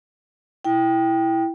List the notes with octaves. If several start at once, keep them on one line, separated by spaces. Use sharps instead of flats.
E4 G5